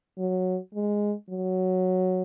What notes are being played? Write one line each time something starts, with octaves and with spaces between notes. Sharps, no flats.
F#3
G#3
F#3